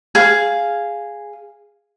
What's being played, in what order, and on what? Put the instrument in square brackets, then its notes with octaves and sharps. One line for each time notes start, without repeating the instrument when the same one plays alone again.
[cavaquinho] G#4 F5